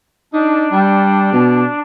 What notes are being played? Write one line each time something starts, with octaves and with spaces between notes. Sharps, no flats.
D4 D#4
G3
B2